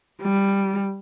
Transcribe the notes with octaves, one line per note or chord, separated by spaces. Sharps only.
G3